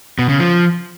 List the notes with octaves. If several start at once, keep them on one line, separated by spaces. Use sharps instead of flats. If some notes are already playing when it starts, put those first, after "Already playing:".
B2
C#3
F3